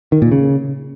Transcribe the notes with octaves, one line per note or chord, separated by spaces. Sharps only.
D#3
A#2
C#3